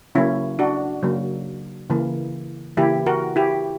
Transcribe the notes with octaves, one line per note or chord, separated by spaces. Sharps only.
C#3 F#3 A#3 C#4 E4
D4 F#4
C#3 F#3 A#3
C#3 E3 A#3
C#3 E3 A#3 E4 G4
F#4 A#4
E4 G4